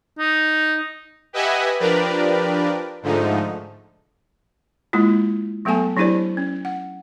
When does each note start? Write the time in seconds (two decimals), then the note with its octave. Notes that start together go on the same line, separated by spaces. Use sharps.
0.18 D#4
1.33 G4 B4 D#5 E5 F#5 G#5
1.80 F3 D4 G4 A#4 B4 D5
3.02 G#2 D3 F3 A3 D#4
4.93 G#3 A#3 E4 F4
5.65 F#3 A3 B3 A4 G#5 A5
5.96 F#3 D4 E4 G4 C5 D5
6.37 C#4
6.65 F#5